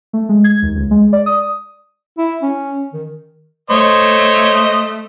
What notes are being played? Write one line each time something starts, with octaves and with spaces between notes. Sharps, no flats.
A3
G#3
G#6
D#2
C#2
G#3
D5
D#6
E4
C#4
D#3
A3 C5 C#5 D#5